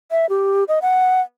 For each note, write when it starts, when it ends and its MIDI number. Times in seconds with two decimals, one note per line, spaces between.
0.11 0.29 76
0.29 0.64 67
0.68 0.79 75
0.82 1.21 78